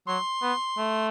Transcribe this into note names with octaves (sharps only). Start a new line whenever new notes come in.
F#3 C6
B3
A3